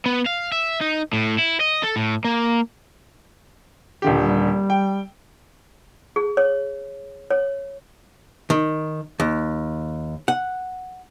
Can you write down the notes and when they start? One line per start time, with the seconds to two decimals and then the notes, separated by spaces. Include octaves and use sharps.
0.06 B3
0.26 F5
0.52 E5
0.81 D#4
1.13 A2
1.38 E4
1.61 D#5
1.83 A4
1.96 A2
2.25 A#3
4.02 D#1 D3 G4
4.19 G3
4.70 G5
6.16 G#4
6.37 C#5
7.30 C#5
8.50 D#3
9.20 D#2
10.28 F#5